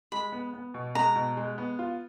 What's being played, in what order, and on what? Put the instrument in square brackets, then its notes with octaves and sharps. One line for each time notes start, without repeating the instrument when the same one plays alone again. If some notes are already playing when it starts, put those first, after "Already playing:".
[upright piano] G#3 [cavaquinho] B5
[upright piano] B3
B3
B2
[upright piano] G#3 [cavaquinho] A#5
[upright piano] B2
G#3
B3
F4